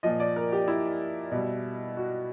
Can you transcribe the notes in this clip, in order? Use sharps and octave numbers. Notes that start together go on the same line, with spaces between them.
A#2 F3 D#5
D5
A#4
G4
E4
B2 G3
F#4